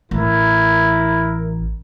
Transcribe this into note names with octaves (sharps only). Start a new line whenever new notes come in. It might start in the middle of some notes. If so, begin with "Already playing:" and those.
A1 E4 A#4